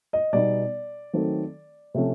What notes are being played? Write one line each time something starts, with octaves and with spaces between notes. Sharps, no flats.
D#5
B2 G3 B3 D#4 D5
D#3 F#3 A3 C4
C3 F3 A3 C#4